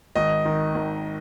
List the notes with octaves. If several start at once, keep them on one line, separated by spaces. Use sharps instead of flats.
G#1 D#5
D#3
G#1